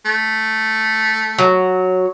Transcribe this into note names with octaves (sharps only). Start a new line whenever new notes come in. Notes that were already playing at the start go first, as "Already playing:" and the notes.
A3
F#3